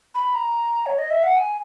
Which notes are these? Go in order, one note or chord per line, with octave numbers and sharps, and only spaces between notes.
B5
A#5
C#5
D#5
E5
F#5
G#5